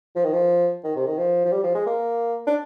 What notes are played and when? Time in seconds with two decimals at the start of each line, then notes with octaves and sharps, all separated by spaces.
0.16 F3
0.24 D#3
0.33 F3
0.84 D#3
0.96 C3
1.07 D#3
1.18 F3
1.45 F3
1.52 G3
1.64 F3
1.75 G#3
1.86 A#3
2.47 D4